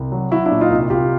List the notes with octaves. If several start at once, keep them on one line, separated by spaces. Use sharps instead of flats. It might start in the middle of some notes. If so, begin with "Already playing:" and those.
Already playing: C2
F#3
F#3 E4 F#4
D4 E4
A#2
D#4 F4
C2
C2 F4 G4